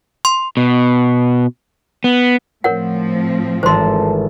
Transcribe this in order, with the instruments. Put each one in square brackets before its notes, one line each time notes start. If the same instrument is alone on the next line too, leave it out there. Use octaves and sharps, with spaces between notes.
[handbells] C6
[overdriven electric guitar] B2
B3
[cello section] A2 F3 C4 [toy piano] A#4 C#5 F#5
[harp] G#1 E3 A4 [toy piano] C5 C6